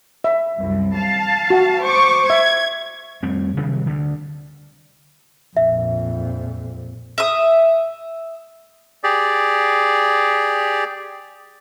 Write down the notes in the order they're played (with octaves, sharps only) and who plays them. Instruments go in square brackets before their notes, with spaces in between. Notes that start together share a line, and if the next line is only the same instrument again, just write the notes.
[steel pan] E5
[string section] C2 F#2
F5 A5
[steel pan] F#4
[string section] C5 C#6 D6
[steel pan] E5 [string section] G#6
[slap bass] F2 G3 A3 C4
C3 D#3 F#3 G3
D2 D3
[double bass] A#1 F2 [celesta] E5
[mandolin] E5 D#6
[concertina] G4 G#4 D5